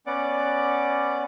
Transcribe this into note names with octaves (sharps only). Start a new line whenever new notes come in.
B3 C#4 D5 F#5 D6